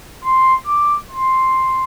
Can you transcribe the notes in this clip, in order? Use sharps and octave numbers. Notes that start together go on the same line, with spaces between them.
C6
D6
C6